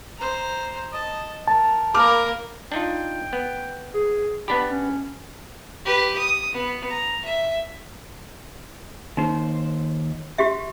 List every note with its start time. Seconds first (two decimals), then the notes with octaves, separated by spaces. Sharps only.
0.18 C5 A#5
0.91 D#5 A5
1.48 A#4 A5
1.94 A#3 A#4 B5 D6 F6
2.72 D4 D#4 F4 G5
3.33 B3
3.94 G#4
4.48 B3 D4 G4 B5
4.70 C#4
5.85 G4 B4
6.18 D#6
6.53 B3
6.90 A#5
7.25 E5
9.17 D#2 D#4 C5
10.38 F#4 G4 E5